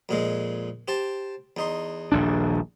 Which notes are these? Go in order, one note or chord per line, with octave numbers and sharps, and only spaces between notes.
F2 A#2 G#3
G4 C5 A5
E2 D#4 C6
D#1 A#1 D4